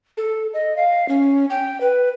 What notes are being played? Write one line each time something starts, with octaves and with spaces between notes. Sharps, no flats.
A4
D#5
F5
C#4
G5
B4